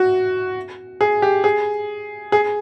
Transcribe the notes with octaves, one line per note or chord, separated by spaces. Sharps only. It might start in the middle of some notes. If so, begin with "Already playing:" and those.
Already playing: F#4
G#4
G4
G#4
G#4